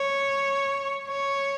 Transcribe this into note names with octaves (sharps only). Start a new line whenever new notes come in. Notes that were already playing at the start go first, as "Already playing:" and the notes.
Already playing: C#5
C#5